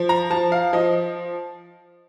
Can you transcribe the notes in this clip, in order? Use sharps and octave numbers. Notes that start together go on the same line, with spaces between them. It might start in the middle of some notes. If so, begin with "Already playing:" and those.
Already playing: F3
A#5
F3 A5
F5
F3 D#5